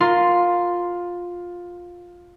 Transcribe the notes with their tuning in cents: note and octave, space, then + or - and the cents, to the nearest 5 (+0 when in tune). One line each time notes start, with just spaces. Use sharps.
F4 +15 A#4 +0 C6 +0